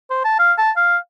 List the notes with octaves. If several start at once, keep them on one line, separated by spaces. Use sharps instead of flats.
C5
A5
F5
A5
F5